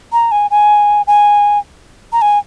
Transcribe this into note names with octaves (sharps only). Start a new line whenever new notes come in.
A#5
G#5
G#5
G#5
A#5
G#5